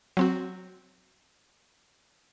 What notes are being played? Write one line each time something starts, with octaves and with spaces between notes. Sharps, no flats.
F#3 C4 F#4